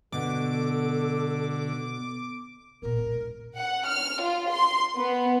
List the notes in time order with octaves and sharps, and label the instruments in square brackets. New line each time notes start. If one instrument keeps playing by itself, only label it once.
[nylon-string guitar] B2 [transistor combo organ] D3 [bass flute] A4 [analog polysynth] D6
[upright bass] A#2 B3 [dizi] A#4
[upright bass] E1 A#1
[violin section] F#5
F6
F4
C6
B3